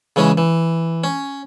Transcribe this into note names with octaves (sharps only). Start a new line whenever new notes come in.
C#3 E3 G#3 C#4
E3
C#4